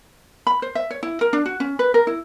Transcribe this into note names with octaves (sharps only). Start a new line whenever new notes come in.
B5
C5
E5
C#5
E4
A#4
D4
F#4
C#4
B4
A#4
E4